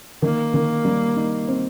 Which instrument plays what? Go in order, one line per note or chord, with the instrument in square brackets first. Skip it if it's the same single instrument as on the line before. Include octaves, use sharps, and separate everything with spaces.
[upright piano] D#3 [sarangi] A#3
[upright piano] D#3
G3
D#4
C4